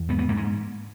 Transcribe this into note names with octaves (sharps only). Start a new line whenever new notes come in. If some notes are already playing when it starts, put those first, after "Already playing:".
Already playing: E2
G#2 B3
B3
G#2 A#3
G#3